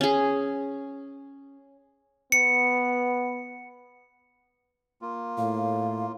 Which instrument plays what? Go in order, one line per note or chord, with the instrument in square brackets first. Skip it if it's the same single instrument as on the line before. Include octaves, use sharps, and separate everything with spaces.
[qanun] C#4 G#4
[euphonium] B3 [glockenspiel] C#7
[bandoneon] A#3 F4
[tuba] A2 [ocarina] F5